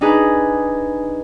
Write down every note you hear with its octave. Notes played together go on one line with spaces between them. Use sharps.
D4 D#4 G#4 B4